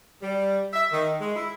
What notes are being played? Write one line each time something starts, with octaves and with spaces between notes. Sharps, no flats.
G3
E5
D#3
G#3
E4